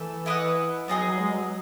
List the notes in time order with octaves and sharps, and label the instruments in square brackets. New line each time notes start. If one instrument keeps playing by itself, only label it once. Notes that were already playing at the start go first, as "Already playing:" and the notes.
Already playing: [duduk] E3 [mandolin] A3 A4 E5
[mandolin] E4 B4 D#5 F#5
[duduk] F#3 [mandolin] B3 D#4 G#4 D#5
[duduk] F#3
G#3
F#3